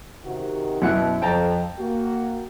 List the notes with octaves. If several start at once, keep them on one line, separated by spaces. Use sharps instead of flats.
C3 D#3 F#4
F#2 B2 E4 F#5
F2 G5 A5 A#5
A#3 F#4